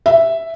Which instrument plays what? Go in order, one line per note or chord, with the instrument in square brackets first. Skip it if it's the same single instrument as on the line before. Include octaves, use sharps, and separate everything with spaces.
[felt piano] E5